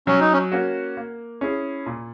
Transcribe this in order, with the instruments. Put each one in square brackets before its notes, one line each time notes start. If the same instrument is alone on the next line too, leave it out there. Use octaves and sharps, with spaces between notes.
[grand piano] F#3 [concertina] C#4
[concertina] D#4
C#4
[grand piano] A#3 C#4 F#4
A#3
C#4 E4 G#4
A#2